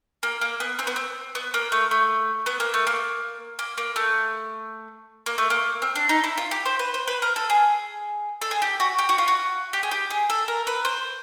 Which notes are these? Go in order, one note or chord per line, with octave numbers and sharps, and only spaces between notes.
A#3
A#3
B3
C4
B3
C4
B3
A#3
A3
A3
B3
A#3
A3
A#3
A#3
A#3
A3
A#3
A3
A#3
C4
D4
D#4
E4
F4
G4
C5
B4
C5
B4
A#4
A4
G#4
A4
G#4
G4
F#4
G4
F#4
F4
F#4
G4
G#4
G4
G#4
A4
A#4
B4
C5